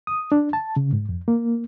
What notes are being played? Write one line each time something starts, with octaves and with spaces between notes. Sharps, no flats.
D#6
D4
A5
C#3
G#2
F2
A#3